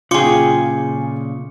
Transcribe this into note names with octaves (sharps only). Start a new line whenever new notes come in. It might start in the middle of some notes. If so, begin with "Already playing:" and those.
A#2 C#3 F4 G#4 G5 C6 D6 C#7